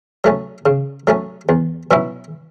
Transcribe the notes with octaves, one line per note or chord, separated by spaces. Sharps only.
F#3 A3 C#4
C#3
F#3 A3 C#4
E2
B2 F#3 C#4 E4